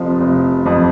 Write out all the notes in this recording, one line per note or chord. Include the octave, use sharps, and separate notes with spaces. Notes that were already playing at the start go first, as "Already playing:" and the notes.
Already playing: F1 F2 F3
F1
F2 F3